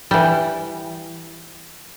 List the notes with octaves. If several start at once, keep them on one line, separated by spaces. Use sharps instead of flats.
E3 G3